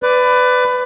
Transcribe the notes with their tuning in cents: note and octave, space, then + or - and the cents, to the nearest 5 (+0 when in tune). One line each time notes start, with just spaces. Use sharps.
B4 +20 D5 +0